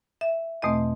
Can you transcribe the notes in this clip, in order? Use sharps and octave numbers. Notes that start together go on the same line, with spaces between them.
E5
E2 B2 A3 C4 D#5